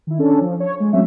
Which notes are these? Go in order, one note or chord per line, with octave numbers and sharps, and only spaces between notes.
D#3 E4
C#4 D4 A4
F3
C#5
G#3
F#3 G#3 A3 C4 C#4 E5